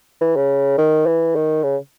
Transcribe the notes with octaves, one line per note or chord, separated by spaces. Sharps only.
E3
C#3
D#3
E3
D#3
C#3